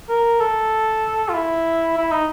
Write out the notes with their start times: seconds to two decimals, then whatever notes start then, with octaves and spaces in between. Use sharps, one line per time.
0.09 A#4
0.40 A4
1.29 F4
1.34 E4
1.97 E4
2.11 D#4